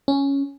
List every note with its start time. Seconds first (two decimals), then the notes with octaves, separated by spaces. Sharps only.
0.08 C#4